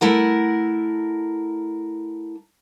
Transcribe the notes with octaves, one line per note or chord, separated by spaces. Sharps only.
A3 E4 A#4 F#5